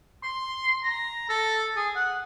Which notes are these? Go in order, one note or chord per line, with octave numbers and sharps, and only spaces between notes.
C6
A#5
A4
G#4
F#5